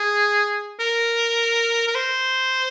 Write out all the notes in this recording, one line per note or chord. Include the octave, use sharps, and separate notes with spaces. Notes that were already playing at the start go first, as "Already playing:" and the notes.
Already playing: G#4
A#4
A#4
C5